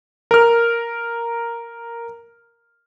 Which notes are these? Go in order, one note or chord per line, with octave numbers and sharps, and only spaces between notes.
A#4 F6